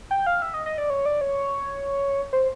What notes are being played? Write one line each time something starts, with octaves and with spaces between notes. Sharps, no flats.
G5
F5
E5
D#5
D#5
D5
C#5
D5
C#5
C5